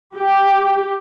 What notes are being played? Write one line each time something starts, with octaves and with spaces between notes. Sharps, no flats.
G4